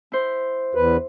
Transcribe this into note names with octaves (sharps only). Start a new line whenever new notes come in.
E4 C5
E2 B4